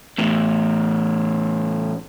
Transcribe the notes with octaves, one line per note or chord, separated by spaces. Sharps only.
E2 A2